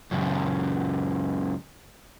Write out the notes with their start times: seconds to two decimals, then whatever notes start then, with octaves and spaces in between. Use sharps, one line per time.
0.11 C#2 F#2